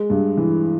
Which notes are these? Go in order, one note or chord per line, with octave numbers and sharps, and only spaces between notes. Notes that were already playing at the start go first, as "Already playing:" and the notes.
Already playing: G#3
G2
E3